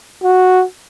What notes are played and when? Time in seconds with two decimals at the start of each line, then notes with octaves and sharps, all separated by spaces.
0.23 F#4